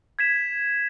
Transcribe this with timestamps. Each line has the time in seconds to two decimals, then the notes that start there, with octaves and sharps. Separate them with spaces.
0.19 G#6 B6 E7